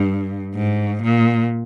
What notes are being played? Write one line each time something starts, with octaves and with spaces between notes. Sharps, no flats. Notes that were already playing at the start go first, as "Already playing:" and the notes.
Already playing: G2
G#2
A#2